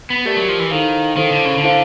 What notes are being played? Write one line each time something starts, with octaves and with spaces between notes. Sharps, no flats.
B3
A3 G4 A#4 D5
F#3
F3
E3
D#3 E4 A4 C5 F5
D#3 E4 A4 C5 F5
D3
C#3
D3
E4 A4 C5 F5